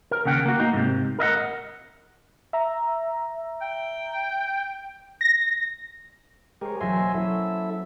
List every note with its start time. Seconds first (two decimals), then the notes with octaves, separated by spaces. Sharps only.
0.11 A#4
0.25 D#2 C#3 F#5 G5
0.46 A#3 F#4
0.60 A#3 D#4
0.73 G#2 C3
1.19 A#4 D#5 E5 F#5
2.53 E5 A#5
3.61 G5
5.21 A#6
6.61 G#3 G4 A#4 C5 C#5 G#5
6.81 E1 F#3 A#4 E5 G#5 C6
6.96 A#3 C5 D#5
7.14 F#3 C#4 E4 A4 E5